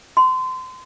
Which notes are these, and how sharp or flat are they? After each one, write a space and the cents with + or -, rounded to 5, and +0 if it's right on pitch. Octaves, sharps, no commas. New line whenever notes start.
C6 -30